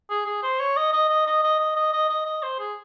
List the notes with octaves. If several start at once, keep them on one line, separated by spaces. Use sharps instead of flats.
G#4
G#4
C5
C#5
D#5
D#5
D#5
D#5
D#5
D#5
D#5
D#5
D#5
D#5
C5
G#4